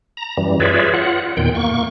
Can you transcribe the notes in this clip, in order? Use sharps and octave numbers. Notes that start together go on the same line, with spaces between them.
A#5
F#2 E3 G3
F4 G#4 B4 C#5 D5 E5
F4 F#5
E2 A#2 D#3 G5
A#3 C#6